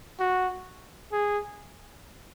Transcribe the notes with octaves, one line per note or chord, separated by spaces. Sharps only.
F#4
G#4